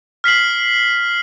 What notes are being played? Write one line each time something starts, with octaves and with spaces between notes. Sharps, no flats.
F6 B6 C7 F#7